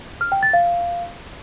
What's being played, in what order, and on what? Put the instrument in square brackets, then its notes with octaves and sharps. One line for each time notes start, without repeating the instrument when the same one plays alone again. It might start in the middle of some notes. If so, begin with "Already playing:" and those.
[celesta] F6
G5
A6
F5